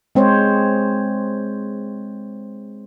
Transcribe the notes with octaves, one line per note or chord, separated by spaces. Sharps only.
G#3 C4 C5 C#5